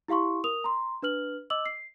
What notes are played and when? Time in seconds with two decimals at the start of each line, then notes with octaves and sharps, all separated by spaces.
0.08 E4 G4 F5 C6 C#6
0.44 A#4 D#6 F7
0.64 A#5 C6
1.02 D4 B4 F6 F#7
1.50 D#5 D6 E6 F#7
1.66 C7